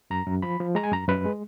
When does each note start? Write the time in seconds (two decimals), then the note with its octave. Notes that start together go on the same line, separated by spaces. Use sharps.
0.10 F#2 A#5
0.26 F#2
0.42 F3 B5
0.60 F3
0.75 G#3 A#5
0.84 G#5
0.92 F#2 A#5
1.08 F#2 B4
1.25 G#3